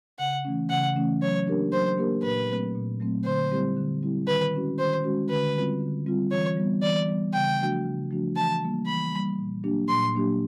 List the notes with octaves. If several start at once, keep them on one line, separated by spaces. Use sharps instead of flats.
C#3 F#5
E3 A3 C#4
C#3 F#5
E3 A3 C#4
F#3 C#5
A#3 D4 G4 A#4
F#3 C5
A#3 D4 G4 A#4
A#2 B4
F#3 A3 C4
A#2
F#3 A3 C4
D3 C5
G3 C4 E4 G4
D3
G3 C4 E4 G4
D#3 B4
G#3 C#4 F#4
D#3 C5
G#3 C#4 F#4
D3 B4
G3 C4 F4
D3
G3 C4 F4
E3 C#5
G3 B3
E3 D5
G3 B3
C#3 G5
F3 A3 D4 F#4
C#3
F3 A3 D4 F#4
E3 A5
G3 A#3
E3 B5
G3 A#3
A#2
F#3 A#3 D4 G4
A#2 C6
F#3 A#3 D4 G4